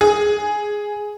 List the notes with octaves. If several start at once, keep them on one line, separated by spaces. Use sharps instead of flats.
G#4